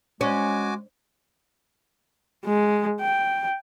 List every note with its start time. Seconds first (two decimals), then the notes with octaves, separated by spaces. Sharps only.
0.21 G#3 C#4 F#4 G#5 D6
2.45 G#3
3.01 G5